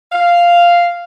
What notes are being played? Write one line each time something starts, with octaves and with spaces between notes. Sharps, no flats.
F5